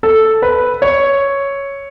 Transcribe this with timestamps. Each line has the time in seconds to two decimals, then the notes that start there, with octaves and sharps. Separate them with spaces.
0.03 A4
0.42 B4
0.82 C#5